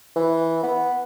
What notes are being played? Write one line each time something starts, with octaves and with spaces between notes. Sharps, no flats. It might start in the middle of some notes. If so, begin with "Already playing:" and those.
E3
B3